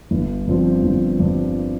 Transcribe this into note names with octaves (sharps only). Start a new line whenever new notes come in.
G1
G2 F3 C4
G1
G2 F3 C4